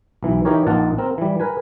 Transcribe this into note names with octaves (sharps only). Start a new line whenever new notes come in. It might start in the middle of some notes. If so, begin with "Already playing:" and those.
B1 E3
E3 D#4 G4 A#4 C#5
A#1 A#3 D#4 F4 F#5 A5
C4 A#4
E3 G3
A#4 B4 G#5